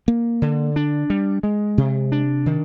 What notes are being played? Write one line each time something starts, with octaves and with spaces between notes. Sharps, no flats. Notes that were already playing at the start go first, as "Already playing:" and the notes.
A#3
D3
D4
G3
G#3
C3
D4
D#3